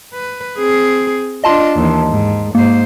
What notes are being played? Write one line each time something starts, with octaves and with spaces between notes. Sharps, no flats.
B4
C4 G#4
D4 F4 D#5 A5 C6
D#2 E3
G#2
G#2 A#3 C5